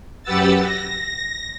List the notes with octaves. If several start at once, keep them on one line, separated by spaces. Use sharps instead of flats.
F#2 G4 B4 F#5 E6 A6
A#6